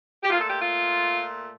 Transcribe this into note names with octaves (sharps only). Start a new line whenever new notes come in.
G4
A#2 A3 F4
A4
G4
F4